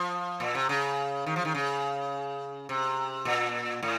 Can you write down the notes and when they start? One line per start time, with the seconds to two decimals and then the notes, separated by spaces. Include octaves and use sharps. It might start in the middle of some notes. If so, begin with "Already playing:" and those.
Already playing: F3
0.40 A#2
0.55 C3
0.69 C#3
1.26 D#3
1.36 F3
1.45 D#3
1.55 C#3
2.69 C3
3.25 A#2
3.83 A2